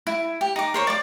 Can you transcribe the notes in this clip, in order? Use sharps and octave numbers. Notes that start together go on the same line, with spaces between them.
E4
G4
D#4 D6
A#4 C5 C#5
D5 D6